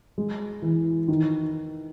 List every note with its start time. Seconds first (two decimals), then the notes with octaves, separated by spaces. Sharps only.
0.18 G#3
0.62 E3
1.08 D#3